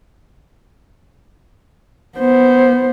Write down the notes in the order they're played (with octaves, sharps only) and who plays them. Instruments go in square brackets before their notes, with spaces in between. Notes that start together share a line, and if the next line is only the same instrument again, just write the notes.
[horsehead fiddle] B3 C5